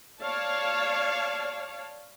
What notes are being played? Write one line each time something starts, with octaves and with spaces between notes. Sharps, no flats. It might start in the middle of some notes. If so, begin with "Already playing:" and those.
C#5 D5 F5 A5